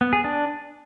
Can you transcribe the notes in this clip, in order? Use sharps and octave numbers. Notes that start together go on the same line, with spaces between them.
B3
G#4
D4